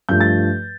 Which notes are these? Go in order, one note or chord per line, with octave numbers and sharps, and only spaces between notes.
G2 F3 A3 G6
A6